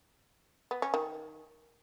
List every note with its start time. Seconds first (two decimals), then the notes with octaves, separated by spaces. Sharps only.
0.71 B3
0.82 C#4
0.94 D#3